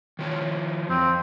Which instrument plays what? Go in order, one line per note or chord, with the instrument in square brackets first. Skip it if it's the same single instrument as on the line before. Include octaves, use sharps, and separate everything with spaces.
[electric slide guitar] D#3 F3 C#5
[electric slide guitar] F2 [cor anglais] C4